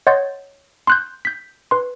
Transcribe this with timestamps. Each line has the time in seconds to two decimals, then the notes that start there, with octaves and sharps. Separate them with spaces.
0.07 C#5 D#5 F#5 C6 G6 A6
0.87 C6 F#6 G6
1.25 G6 B6
1.71 B4 C6